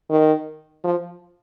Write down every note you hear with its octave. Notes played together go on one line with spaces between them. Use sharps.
D#3
F3